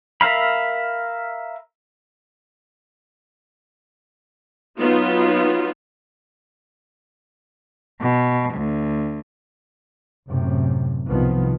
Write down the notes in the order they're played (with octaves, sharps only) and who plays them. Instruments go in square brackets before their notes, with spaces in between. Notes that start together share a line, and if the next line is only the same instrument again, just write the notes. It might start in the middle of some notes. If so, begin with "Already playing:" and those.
[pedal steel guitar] A#4 E5 F5 B5
[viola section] F#3 B3 D#4 F4
[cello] B2
D2
[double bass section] F#2 A2 C3
C2 B2 D#3 F3 B3